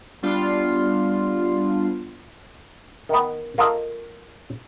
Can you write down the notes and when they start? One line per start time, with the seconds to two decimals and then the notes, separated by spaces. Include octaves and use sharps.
0.23 G3 B3 D4 F4
3.09 D#3 B3
3.58 A#3 F4 A4 D#5 F5